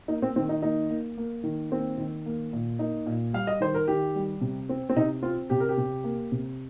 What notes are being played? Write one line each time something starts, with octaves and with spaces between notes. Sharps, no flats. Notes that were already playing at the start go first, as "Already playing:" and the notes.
A#3 D#4
C4
D#3 C4
D#4
A#3 D#4
A#3
A#3
D#3
A#3 C4
D#3
A#3
A#2
A#3 D#4
A#2
G3 F5
D#5
D#3 C5
A#4
D#3 G4
G3
C3
C4
C4
C3 D#4
C4 F4
C3 G4
A#4
G4
C3
A#3
C3